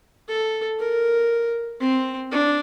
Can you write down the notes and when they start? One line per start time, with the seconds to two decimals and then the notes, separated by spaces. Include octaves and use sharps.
0.28 A4
0.79 A#4
1.81 C4
2.32 D4